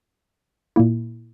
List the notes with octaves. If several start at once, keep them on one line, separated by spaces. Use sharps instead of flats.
A#2 A#3 E4